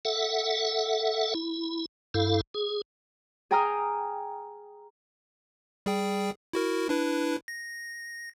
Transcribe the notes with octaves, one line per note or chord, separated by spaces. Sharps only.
A4 E5 F#5
E4
G2 E4 A4 F5
G#4
G#4 G5 G#5 A#5 D#6 F6
G3 G#4 G5
E4 F#4 A#4
D4 E4 B4
A#6